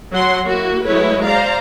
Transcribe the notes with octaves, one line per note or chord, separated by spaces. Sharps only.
F#3 F#5 C6
A#3 E4 F#4
F#3 G#3 A3 E4 B4 C#5
C5 D5 F5 A#5